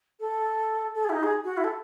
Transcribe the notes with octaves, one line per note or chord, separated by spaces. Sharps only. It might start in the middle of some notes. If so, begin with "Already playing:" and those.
A4
A4
G#4
E4
D#4
G#4
F#4
E4
A4